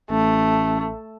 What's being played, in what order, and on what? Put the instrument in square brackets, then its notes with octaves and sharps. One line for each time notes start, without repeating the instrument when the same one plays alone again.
[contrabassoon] A1 [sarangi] A3